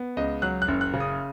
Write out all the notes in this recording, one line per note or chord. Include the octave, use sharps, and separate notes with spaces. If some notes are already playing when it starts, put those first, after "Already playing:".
Already playing: B3
C#2 D#5
F#3 F#6
F#6
F#1
F#6
C#3
D#6